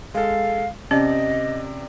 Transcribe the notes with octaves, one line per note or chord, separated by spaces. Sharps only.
G#3 A4 F5
C3 C#4 D5 D#5